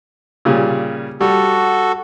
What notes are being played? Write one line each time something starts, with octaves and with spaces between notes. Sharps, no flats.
A#2 C#3 G3
G3 F#4 A4